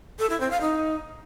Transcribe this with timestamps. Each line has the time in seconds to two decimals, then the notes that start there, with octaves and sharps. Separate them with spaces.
0.19 A4
0.30 E4
0.40 C4
0.51 F5
0.61 D#4